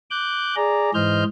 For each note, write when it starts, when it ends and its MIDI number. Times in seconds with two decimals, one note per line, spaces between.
0.11 0.55 86
0.11 0.55 90
0.11 0.55 91
0.56 0.91 68
0.56 0.91 74
0.56 0.91 82
0.94 1.24 44
0.94 1.24 52
0.94 1.24 72
0.94 1.24 75
0.94 1.24 89
0.94 1.24 91